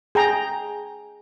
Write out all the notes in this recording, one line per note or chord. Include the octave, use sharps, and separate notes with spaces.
G#4 G5 A#5